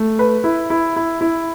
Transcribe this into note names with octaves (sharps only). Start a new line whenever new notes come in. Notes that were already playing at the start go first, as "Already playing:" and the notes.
Already playing: A3
B4
E4
E4
E4
E4